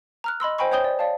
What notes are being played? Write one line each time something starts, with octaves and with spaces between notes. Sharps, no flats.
A#5 F6 F#6
D#5 B5 C6 E6
C5 D#5 G5 G#5 B5 C#6
C5 C#5 G5 D#6 G6 G7
D5
D5 F5 A5